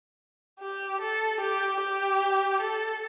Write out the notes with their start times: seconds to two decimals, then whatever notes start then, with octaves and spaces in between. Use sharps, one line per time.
0.60 G4
1.01 A4
1.40 G4
1.81 G4
2.61 A4